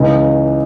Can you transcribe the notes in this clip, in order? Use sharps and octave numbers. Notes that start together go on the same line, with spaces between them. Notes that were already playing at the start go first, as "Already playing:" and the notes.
Already playing: C#2 C#3 E3 D#4